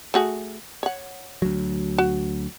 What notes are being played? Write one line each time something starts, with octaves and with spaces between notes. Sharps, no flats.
A3 F#4 G#4
C#5 F#5
D2 F#3
F#4